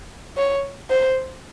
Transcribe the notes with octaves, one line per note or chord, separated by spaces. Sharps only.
C#5
C5